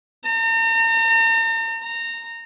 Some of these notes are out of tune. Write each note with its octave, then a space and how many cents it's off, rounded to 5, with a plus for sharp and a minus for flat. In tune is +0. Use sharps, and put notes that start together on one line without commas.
A#5 -45
A#5 -20